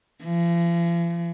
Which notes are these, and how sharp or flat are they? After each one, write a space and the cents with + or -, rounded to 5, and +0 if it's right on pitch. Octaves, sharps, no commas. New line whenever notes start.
F3 -45